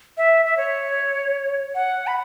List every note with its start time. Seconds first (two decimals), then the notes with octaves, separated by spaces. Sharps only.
0.17 E5
0.46 E5
0.57 C#5
1.75 F#5
2.07 B5